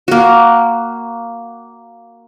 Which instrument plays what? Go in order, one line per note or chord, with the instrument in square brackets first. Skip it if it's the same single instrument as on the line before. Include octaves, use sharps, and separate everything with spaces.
[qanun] A#3 F#4